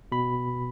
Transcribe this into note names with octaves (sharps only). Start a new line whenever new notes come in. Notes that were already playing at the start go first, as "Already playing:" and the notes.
B2 B5